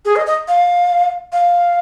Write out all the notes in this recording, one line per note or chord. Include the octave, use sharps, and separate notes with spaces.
G#4
D#5
D#5
F5
F5